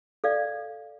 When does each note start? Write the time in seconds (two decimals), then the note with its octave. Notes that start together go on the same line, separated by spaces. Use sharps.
0.24 A4 D5 F5